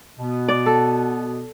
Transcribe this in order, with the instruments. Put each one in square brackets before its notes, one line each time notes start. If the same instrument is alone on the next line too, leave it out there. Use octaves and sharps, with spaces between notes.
[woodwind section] B2 B3
[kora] D5
A4